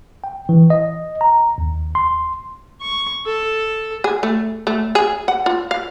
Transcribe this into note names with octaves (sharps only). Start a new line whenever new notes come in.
G5
E3
D#5
A#5
D#2
C6
C#6
A4
G#4
A3
A3
G#4
F#5
F4
F5